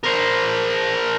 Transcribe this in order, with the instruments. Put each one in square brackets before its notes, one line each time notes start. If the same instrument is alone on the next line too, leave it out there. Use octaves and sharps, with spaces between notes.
[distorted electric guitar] A#4 C5